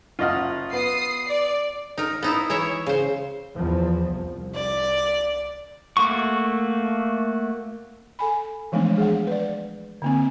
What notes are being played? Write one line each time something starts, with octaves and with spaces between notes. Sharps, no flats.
F#1 F4 D#5 F#5 F6
B3 D#6 C7
D5
D#4 A#4
B3 D#4 E4
E3 E4 C#5 E5
C#3 C5
E2 F3
C2
D5
A3 A#3 F#4 C#6
A4 G#5 B5
E3 F3 G#3 A3 B3 D4
G#4 F5 F#5
B4 D5
D3 A#3 C4